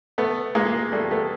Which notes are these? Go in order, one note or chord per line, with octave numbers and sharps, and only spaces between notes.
A3 B3
G#3 A#3
G3 A3
A3 B3